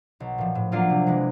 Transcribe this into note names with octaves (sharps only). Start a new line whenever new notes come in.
B1
A#2 F3
A2
F#3 A#3 D4 F4
C3
E3 G#3